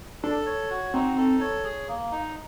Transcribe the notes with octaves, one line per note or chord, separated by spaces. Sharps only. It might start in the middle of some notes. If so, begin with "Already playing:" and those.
D4 A4
C#5
F#4
C4 D#4
A4
C#5
G#4
A#3
D#4